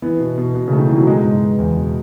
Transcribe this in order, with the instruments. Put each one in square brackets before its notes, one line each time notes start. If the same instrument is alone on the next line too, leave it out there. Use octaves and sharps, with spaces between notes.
[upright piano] E3 [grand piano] B3
[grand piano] B2
B2
B2
[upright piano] C#3 [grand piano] A3
[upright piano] D#3
[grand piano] B2 [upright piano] E3
[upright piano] F#3
[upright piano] G#3 [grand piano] D#4
[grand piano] G#2
B3
E2
B2